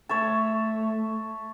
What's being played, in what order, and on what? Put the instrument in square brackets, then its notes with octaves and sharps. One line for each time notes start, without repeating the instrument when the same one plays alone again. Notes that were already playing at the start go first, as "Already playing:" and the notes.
[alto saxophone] A3 [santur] C#5 E5 A5